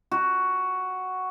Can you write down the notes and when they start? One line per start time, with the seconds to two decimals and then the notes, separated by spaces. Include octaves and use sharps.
0.12 F#4